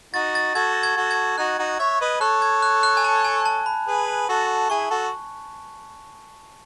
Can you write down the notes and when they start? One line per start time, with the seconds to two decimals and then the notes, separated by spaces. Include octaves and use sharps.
0.14 D#4 F#4 A6
0.35 A6
0.55 F#4 A4 G#6
0.83 G#6
0.96 F#4 A4
1.11 G#6
1.38 D#4 F#4 F#6
1.59 D#4 F#4
1.79 C#5 E5 G#6
2.01 B4 D#5
2.21 A4 C#5 F#6
2.42 G#6
2.62 F#6
2.83 F#6
2.97 G#5
3.04 A5
3.25 G#5
3.46 A5
3.66 B5
3.87 G#4 B4
4.29 F#4 A4
4.70 E4 G#4 C#6
4.91 F#4 A4